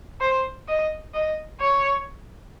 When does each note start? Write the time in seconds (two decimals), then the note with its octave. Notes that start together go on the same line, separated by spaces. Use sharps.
0.21 C5
0.68 D#5
1.14 D#5
1.60 C#5